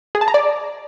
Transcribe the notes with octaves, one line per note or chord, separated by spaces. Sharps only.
G#4
A5
A#5
D5